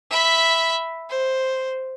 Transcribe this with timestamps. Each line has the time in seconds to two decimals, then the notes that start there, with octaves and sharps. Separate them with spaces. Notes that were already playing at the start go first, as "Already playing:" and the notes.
0.11 E5 B5
1.10 C5